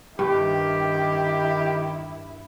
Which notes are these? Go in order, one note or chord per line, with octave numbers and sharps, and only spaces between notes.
G2 D#3 E4 G4